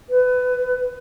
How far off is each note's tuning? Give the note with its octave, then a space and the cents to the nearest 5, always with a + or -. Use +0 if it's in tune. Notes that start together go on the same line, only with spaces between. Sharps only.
B4 +20